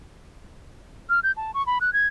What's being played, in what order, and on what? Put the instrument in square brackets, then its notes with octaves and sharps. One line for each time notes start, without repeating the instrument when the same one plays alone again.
[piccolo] F6
G6
A5
C#6
B5
F#6
G#6